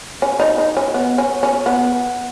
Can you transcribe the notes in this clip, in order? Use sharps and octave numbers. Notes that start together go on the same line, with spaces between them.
C#4
D#4
D#4
C#4
B3
C#4
C#4
B3